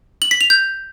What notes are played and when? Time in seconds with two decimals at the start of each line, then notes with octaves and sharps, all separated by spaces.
0.22 F#7
0.31 B6
0.41 F7
0.50 G6